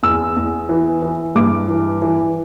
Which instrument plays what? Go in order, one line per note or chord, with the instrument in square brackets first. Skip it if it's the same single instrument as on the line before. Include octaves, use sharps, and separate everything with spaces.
[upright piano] E2 E6
E2
E3
E3
G2 D6
E3
E3